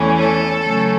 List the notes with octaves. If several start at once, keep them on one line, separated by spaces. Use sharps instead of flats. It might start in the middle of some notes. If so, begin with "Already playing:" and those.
Already playing: E2 E3 A3 C#4
A4
C#3 F#3 A3 C#4